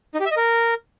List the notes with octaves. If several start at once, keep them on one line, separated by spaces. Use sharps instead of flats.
D#4
G4
E5
D#5
A#4